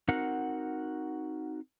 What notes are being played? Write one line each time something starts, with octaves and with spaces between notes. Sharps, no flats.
C4 D#4 F#4 A#4 F#5